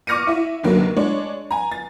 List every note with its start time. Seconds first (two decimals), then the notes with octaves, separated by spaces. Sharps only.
0.07 C#6 D6 F6 A#6 C#7 D#7
0.27 E4 E5
0.63 F1 D#2 D3 F#3 A#3
0.96 G#3 D4 C#5
1.51 G#5 A#5
1.71 A6